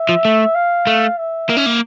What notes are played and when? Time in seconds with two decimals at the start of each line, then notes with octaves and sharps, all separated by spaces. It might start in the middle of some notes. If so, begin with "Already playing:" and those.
Already playing: E5
0.09 F3
0.25 A3
0.55 F5
0.87 A3
1.18 E5
1.49 A#3
1.57 C#4
1.66 A#3